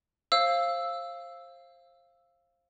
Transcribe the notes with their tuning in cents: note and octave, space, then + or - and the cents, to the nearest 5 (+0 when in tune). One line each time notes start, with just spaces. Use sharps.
C5 +30 F5 -10 E6 +0